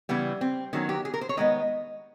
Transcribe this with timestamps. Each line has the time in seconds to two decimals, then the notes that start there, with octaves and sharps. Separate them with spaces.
0.09 C#3 E3 G3 B3
0.41 C4
0.73 D#3 F#3 B3 C#4
0.89 G4
1.05 G#4
1.14 A#4
1.21 C5
1.29 C#5
1.37 D#3 G#3 B3 D#5